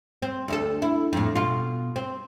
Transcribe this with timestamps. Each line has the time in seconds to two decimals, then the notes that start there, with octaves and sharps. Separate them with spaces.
0.22 C4
0.48 D2 E4 A4
0.82 E4
1.13 F2 A2
1.35 B2 F4
1.96 C4